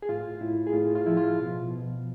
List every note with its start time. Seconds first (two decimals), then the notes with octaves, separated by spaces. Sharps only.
0.02 G#4
0.09 A2 F4
0.41 A2 E4
0.67 G#4
0.73 A2 F4
0.95 F4
1.06 F3 E4
1.17 F4
1.39 B2
1.71 B2